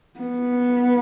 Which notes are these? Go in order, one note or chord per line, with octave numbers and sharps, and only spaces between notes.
B3